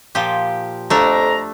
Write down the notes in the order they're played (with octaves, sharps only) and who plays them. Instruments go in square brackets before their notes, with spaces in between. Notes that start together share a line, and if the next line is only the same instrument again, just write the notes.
[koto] A#2 F3 G4
[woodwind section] F2 A#5 [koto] A3 D4